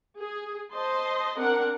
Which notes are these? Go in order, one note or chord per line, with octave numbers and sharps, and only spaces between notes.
G#4
C5 D#5 A5 C6
C4 D4 A#4 F#5